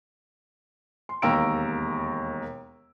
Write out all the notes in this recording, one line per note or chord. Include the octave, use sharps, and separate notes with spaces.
C6
E1 D#2 F5 A#5 E6 D7